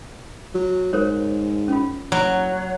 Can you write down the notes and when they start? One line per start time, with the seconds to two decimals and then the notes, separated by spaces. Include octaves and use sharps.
0.54 F#3
0.93 G#2 A#4 C5 C#5
1.68 C#4 F4
2.12 F#1 F#3